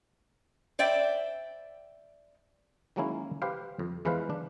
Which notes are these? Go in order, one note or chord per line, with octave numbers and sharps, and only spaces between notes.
C5 D5 E5 G5
D#3 F#3 G#3 A#3 C#4 E4
G4 B4 C5 F5
F2
E2 E3 G#3 B4 C5 F5
D4